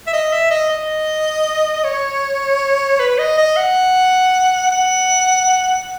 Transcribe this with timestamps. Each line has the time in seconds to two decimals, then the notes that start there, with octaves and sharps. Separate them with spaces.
0.07 E5
0.13 D#5
0.33 E5
0.51 D#5
0.70 D#5
1.84 C#5
3.00 B4
3.19 D#5
3.38 D#5
3.57 F#5
4.71 F#5